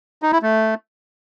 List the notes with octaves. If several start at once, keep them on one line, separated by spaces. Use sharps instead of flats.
D#4
E4
A3